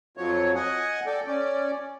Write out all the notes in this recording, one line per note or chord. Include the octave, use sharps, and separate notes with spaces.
F2 F3 F#3 C#5
D#5 F#5 G#5
A4 D5 G5
C#4 D5